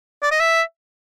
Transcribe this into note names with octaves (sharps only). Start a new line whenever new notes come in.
D5
D#5
E5